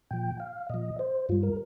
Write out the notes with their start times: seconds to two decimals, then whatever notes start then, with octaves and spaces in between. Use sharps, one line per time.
0.11 A#2 F3 G5
0.40 F5
0.70 A#2 F3 D#5
0.99 C5
1.29 G2 G3 F4
1.43 A#4